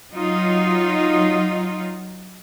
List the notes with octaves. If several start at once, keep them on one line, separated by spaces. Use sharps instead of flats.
F#3 D#4 F4